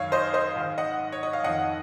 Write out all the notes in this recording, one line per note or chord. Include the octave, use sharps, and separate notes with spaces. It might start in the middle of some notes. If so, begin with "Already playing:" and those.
Already playing: F#2 D#3 C#5 F5
C5 D#5
C5 D#5
G#2 D#3
D#5 F#5
C#5
D#5
F5
F2 D#3 D#5 F#5